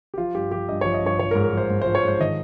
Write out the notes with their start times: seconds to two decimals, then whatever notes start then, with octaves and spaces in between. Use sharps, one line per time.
0.14 G4
0.18 F3 F4
0.34 G2 G4
0.51 F3 G4
0.69 G2 D#5
0.81 F3 C#5
0.94 D#5
1.02 G2 C#5
1.19 F3 C#5
1.31 A#4
1.35 G#2
1.44 A#4
1.52 F3 C5
1.70 G#2
1.82 C5
1.86 F3
1.95 C#5
2.04 G#2 C5
2.19 D#3 D#5